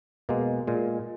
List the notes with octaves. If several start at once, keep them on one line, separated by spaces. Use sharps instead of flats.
B2 G#3 A#3
A#2 G#3